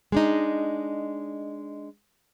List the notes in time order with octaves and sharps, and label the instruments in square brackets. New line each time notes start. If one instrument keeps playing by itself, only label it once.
[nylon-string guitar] G#3 D4 D#4